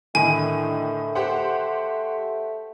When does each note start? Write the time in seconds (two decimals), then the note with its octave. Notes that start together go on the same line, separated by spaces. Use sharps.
0.15 A2 D3 D#3 A3 G#5
1.15 G4 C5 F#5